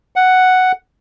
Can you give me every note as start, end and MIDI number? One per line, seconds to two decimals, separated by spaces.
0.16 0.72 78